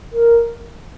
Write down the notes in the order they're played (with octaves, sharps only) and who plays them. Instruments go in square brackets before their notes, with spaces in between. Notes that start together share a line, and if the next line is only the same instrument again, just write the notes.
[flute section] A#4